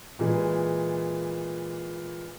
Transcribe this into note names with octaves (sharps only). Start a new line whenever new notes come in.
A#2 E3 G#3